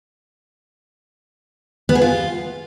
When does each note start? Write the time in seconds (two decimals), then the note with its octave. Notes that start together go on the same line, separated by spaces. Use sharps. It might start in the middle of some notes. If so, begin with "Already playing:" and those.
1.89 B3
1.95 G#4
2.01 F4